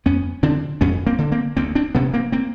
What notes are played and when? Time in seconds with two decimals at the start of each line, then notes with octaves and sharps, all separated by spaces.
0.06 F2 B3 C#4
0.43 D3 C4 D4
0.81 F2 B3 C#4
1.07 A#3 C4
1.18 D3
1.32 A#3 C4
1.57 D2 A#3 C4
1.75 C4 D4
1.95 C3 B3 C#4
2.14 A#3 C4
2.32 A#3 C4